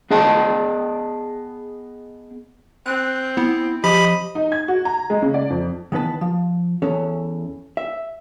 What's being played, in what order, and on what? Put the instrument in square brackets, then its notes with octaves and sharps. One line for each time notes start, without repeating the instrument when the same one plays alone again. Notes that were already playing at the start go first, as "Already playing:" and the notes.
[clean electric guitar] B3 G#4 D#5 G5 A5
[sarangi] C4 [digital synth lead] F#6
[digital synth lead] B3 [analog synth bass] E4
[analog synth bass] F3 [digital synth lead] G4 [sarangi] D#5 [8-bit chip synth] B5
[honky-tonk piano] D#4
G#6
F#4
A#5
G#3
C#3
D5
F2
[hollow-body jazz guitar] D#3 E3 B3 B4 A5
F3
E2 E3 C#4 A4
E5